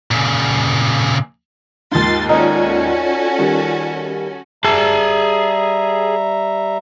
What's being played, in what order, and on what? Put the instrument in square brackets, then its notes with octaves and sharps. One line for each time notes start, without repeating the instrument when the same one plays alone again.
[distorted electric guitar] A#2 C#3
[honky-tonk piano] D#2 G#2 [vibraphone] F4 [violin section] C6 A6
[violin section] C#4 F#4 A4 [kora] D#4 [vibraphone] F4 C#5 D5
[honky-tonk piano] D#3 G3
[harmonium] G3 E5 A#5 [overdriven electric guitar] G#4 A5